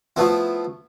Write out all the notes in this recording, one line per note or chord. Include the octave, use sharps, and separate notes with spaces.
F3 A3 B3 E4